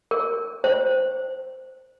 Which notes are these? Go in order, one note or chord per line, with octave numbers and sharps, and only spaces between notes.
A#4
C5